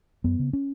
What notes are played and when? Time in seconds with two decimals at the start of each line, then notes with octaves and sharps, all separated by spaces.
0.24 F#2 B3
0.39 C#3
0.53 C#4